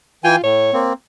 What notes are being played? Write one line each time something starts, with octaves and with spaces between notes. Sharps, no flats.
E3 F4 G5 G#5
A2 C#5
A#3 C4